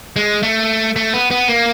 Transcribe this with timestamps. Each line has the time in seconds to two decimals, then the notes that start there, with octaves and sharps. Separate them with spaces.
0.16 G#3
0.43 A3
0.96 A3
1.14 B3
1.31 B3
1.48 A#3